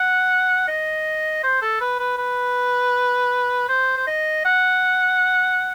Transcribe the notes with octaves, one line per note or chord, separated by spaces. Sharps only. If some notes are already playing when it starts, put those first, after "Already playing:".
Already playing: F#5
D#5
C5
A4
B4
B4
B4
C5
C5
D#5
F#5